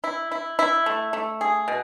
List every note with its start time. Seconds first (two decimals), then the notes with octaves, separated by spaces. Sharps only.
0.04 E4
0.31 E4
0.59 E4
0.86 A3
1.13 A3
1.41 G#4
1.68 B2